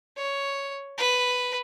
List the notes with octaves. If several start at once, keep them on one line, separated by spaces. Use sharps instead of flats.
C#5
B4